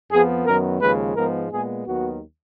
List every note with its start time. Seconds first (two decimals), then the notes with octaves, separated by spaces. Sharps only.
0.11 F2 F3 B3 G#4
0.46 F#2 D#3 F#3 B3 A#4
0.81 D#2 C#3 F3 G#3 B4
1.16 G#2 F3 G#3 B3 A#4
1.51 A#2 G#3 B3 G#4
1.87 D#2 D#3 F#3 B3 F#4